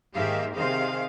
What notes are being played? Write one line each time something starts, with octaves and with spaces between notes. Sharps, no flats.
G#2 D#3 A#3 G4 E5 F5
C3 D#3 G#4 C5 F5